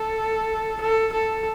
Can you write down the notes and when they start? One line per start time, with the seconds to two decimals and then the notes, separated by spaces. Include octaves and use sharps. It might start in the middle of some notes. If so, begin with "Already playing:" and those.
Already playing: A4
0.81 A4
1.12 A4